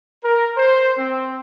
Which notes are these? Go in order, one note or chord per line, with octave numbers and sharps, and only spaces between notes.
A#4
C5
C4